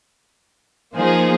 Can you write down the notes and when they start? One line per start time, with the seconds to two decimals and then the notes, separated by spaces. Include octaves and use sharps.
0.95 F3 A#3 D#4 G#4 C5